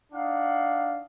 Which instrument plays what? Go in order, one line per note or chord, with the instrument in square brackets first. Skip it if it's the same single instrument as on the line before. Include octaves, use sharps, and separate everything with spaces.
[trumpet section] D4 D#4 F5 F#5